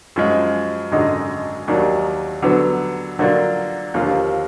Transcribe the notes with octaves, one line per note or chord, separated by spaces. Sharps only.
F#2 F3 G#3
G#1 F#2 D3 G#3 D#4
D#2 D#3 F#3 D4
D3 F#3 B3
D3 F#3 A#3 D4 F4
D#2 D3 F3 A#3 F4